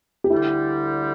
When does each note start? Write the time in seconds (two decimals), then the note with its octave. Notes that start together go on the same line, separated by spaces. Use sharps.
0.24 G4
0.30 D2 D3 G3 E4